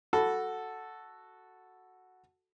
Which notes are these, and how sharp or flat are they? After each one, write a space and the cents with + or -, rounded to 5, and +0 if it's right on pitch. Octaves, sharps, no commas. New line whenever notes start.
F#4 +0 A4 +0 B5 +0